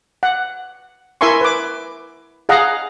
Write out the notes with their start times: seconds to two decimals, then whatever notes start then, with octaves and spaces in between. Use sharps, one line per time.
0.23 F#5
1.21 E4 A#4 E5 G#5 C6 C#6
1.41 B4 D6
2.49 G#4 D#5 F5 F#5 A#5